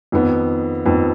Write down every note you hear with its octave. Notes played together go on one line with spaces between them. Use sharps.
F2 D#3 B3
F2 D#3 B3